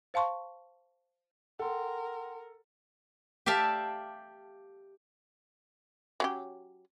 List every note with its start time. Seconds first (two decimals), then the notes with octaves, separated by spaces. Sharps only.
0.14 C5 F5 A5 C6 C#6
1.59 A4 A#4 F#5 G5 C6
3.46 G4 D5 E5 F5 A5
6.20 F#3 C#4 G4